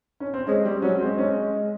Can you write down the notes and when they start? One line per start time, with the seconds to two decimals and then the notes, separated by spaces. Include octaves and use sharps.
0.20 C#4
0.34 C4
0.47 G#3 C#4
0.64 G3 C4
0.82 F#3 C#4
1.01 G#3 C4
1.18 C#4